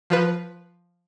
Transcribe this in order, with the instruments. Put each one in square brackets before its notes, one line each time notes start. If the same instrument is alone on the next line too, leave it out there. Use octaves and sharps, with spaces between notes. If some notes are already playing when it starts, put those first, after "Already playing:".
[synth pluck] F3 F4 B4